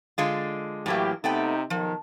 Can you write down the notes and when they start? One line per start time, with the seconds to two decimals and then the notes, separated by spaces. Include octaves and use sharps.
0.18 D3 G#3 F4
0.86 A2 E3 F#3 A#3 G4
1.24 C3 A3 B3 D#4 G5
1.70 B1 D#3 F3